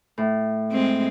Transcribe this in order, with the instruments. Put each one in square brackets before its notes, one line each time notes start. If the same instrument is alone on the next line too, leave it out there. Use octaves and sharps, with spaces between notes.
[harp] A2
[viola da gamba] G#3 C4